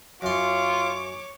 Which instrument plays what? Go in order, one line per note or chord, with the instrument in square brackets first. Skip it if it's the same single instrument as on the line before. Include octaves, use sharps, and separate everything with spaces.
[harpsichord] F#2 C6 [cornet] F4 [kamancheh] C#5 D6